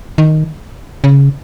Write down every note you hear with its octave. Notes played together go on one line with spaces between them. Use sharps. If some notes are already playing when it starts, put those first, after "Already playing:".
D#3
C#3